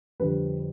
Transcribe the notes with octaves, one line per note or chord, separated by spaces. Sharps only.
F2 D3 G3 B4